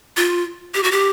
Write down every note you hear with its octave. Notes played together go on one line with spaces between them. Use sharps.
F4
G4
F#4
G4